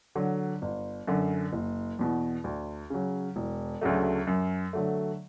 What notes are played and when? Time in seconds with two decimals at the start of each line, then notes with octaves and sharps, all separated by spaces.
0.15 D3 F#3
0.62 G1
1.07 F#2 D3
1.52 F#1
1.99 E2 B2
2.44 D2
2.90 C#3 F#3
3.36 E1
3.81 D2 C#3 F#3 A3
4.27 F#2
4.73 D3 F#3 A3